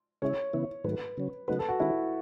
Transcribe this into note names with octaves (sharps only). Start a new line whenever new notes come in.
C#3 G#3 C#4 E4 C#5
C#3 E3 B3 E4
G#2 D#3 F#3 A3 B4
C#3 F#3 C#4
C#3 F#3 A3 D#4 F#4 B4
A4
F#4
D#3 G#3 C#4 E4 F#4